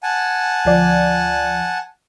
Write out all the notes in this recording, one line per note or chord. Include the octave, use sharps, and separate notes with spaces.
F#5 G#5 A5
D2 F3 D5